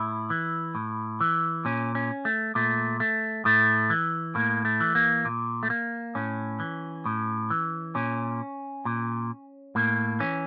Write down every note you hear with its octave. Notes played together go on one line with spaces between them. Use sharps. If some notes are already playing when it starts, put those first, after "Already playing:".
Already playing: A2 E4
E3
A2
E3
A#2 C#4
C#4
A3
A#2 A3
A3
A2 A3
E3
A2 A#3
A3
E3
A#3
A#2
A3
A#3
A2 C#4
E3
A2
E3
A#2 C#4
A#2
A2 A#3
E3 C#4